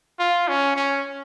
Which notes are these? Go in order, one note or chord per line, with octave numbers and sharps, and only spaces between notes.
F4
C#4
C#4